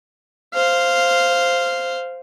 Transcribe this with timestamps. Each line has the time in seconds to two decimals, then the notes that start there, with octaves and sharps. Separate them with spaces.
0.54 C5 F5